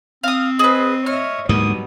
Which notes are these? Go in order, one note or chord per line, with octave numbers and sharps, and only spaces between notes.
C4 F5 D#6
G#4 B4 C5 D#5
C#5 D#5 E5 F6
D2 G#2 B2 F#3 G3 A#3 D#6